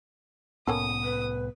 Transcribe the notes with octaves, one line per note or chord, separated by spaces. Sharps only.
C2 A2 A#3 B3 C#4 A4 D#6
B4